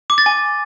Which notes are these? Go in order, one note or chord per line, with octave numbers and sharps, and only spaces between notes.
D6
A6
G#5